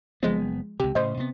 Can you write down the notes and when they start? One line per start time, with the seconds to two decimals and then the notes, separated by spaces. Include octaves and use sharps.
0.23 F#1 F3 G#3 B3
0.80 C#2 C3 G4
0.95 A2 C#3 C5 D#5
1.17 C3 B3